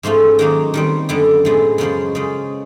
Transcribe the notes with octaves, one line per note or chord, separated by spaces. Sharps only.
G#2 F3 A3 C#4 F4
D#3 F#3 A#3 D#4
D#3 G3 C4
F#2 D3 G3 B3
A2 F3 G#3 B3
F#2 C#3 F3 G#3 B3
C#3 F3 G#3